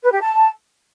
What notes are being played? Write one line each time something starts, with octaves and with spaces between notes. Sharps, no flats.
B4
G4
A5